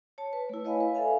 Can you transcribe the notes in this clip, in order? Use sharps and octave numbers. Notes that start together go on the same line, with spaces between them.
C#5 A5
B4
A3 E4
B4 C#5 D#5 F5 G#5 B5
B4
A4 E5 F5 G#5